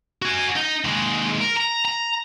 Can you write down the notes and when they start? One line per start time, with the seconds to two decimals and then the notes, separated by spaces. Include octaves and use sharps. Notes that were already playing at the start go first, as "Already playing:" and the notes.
0.22 F#4 G#5
0.56 D#4
0.85 D#2 G#3
1.40 A#4
1.57 A#5
1.85 A#5